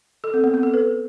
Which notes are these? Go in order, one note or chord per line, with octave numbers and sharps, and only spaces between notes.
A4
C4
B3
C4
A4
B4